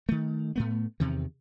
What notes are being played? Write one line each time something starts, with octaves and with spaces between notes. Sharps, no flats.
D#3 A3
A2 A3 B3
E2 C3 D#3